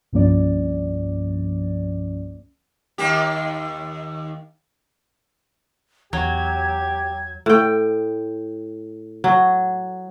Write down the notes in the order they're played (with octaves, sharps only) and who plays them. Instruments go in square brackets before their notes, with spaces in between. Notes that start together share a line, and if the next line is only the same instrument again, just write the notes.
[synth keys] C2 G2 F3 A#3 C#4 D5
[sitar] D#2 A#3 G4
[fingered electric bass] E2 [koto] F#3 [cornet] G4 [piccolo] G#6
[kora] A2 G5
F#3